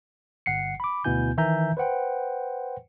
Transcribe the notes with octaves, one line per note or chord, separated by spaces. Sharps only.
G1 F#5 C7 C#7
B5 D6
D2 B2 B3 E4 G#5 G6
D#3 E3 E5 G#5 A#5 G6
B4 C5 F#5 G5